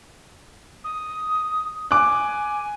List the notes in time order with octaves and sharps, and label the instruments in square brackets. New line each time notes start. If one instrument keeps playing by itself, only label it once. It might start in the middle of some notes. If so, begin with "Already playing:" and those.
[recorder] D#6
[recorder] G#5 [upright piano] D6 F#6